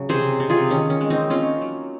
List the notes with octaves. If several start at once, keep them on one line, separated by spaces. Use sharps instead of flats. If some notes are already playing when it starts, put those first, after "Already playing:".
Already playing: C#3 F#3
C3 G#4 C5
C3
F4 G#4
D#3 C#4
C#4
G#3
C4 D#4
A#3 C#4 F4
F#3